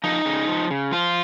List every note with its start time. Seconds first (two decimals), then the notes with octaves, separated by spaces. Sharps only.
0.04 F3 D#4
0.25 C#3
0.48 F3
0.71 C#3
0.91 F3 F4